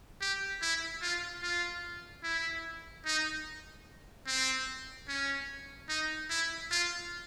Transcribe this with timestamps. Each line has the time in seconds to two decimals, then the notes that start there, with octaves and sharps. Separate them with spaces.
0.21 G4
0.62 E4
1.02 F4
1.43 F4
2.24 E4
3.05 D#4
4.27 C4
5.08 C#4
5.89 D#4
6.30 E4
6.71 F4